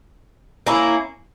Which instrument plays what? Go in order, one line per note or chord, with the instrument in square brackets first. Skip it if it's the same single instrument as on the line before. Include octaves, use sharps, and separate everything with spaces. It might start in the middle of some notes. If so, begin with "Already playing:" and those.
[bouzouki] A#3 C#4 E4